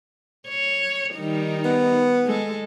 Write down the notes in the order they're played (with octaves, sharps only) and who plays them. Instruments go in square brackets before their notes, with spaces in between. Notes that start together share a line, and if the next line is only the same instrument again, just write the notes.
[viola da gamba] C#5
D#3 G3 D#4
[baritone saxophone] B3
[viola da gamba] G#3 A4